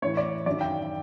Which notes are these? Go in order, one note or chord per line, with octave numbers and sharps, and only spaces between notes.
A2 E3 C#5
D5
F#2 D#3 D5
G5